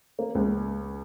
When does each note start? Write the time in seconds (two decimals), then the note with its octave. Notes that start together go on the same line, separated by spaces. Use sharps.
0.19 A#3
0.35 C#2